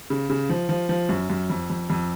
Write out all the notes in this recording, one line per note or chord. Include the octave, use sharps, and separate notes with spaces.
C#3
C#3
F3
F3
F3
F#2
F#2
F2
F2
F2